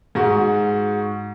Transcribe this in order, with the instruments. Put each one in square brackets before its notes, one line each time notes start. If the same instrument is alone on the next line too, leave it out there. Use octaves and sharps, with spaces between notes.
[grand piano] G#2 F#4